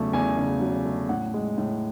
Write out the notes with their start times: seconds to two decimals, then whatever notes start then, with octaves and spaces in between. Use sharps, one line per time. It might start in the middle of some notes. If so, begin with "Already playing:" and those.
Already playing: E2 C#3 F#3 A3 A5
0.13 E2 G#5
0.37 C#3
0.61 F#3
0.85 A3
1.09 A2 F#5
1.34 G#3
1.58 A2